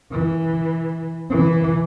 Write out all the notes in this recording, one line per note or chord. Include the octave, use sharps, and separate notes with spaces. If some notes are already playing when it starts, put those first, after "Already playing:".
E3
E3